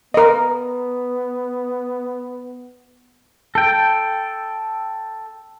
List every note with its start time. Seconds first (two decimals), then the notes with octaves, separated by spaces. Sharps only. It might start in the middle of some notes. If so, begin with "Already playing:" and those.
0.14 B3 A#4 D#5
3.55 A4 G5